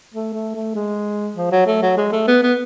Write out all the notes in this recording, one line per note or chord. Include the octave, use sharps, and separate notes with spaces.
A3
A3
A3
G#3
F3
F#3
A3
F#3
G#3
A3
B3
B3